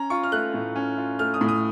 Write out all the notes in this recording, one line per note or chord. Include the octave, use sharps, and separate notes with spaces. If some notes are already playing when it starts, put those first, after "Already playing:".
Already playing: C#4 A#5
F4 C#6
F6
A3 F#6
A2
C#4
F4
A3 F6
D#6
A2
D#6